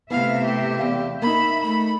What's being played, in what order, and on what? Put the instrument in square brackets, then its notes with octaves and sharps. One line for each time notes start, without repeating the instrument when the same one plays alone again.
[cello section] C3 A3 E5 [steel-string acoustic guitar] B3 E4 [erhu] F5
[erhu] G4
[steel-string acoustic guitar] E2 F5
[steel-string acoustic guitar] A#3 D#4 [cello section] E5 [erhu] B5
[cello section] A3 [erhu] B5